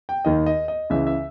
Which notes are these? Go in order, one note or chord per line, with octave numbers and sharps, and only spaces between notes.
G5
D#2 D#3 D#5
D#5
D#5
C#2 C#3 E3 E5
E5